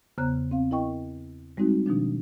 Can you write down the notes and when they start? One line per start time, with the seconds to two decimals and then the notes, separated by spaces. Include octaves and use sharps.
0.18 E2 C#3 B3 C5 A#5 F#6
0.51 C4 F5
0.71 E4 A#4 D#5 G5 C#6
1.57 G3 G#3 C4 D#4 F#4
1.86 B2 D#3 F3 D4